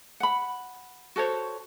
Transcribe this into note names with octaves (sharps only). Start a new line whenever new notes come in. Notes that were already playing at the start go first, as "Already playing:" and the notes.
F#5 B5
F#4 A4 C5 C#5